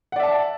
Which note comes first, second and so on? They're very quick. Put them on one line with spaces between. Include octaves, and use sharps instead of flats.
F#5 D5 E5 A5